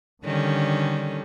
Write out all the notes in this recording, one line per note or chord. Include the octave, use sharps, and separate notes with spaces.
D3 D#3 G3 C#4